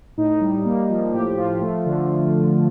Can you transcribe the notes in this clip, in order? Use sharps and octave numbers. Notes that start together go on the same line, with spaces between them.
A2 D#4
G3
A#3
F3
A2 G4
F3 F4
A3
D3